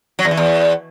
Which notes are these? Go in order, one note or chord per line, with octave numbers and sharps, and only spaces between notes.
F#3
E2
E3
E2